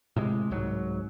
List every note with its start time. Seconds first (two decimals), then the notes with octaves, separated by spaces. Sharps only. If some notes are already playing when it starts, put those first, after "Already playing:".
0.16 A2 C3 G#3
0.51 C2 G#2 F#3